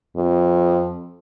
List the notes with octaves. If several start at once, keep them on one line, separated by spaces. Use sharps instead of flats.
F2